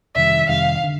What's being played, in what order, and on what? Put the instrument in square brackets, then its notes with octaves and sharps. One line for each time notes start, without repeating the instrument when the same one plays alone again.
[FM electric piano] F2 C3 D#3 G3 [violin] E5
[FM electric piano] F2 C3 D#3 G3 [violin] F5
[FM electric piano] D3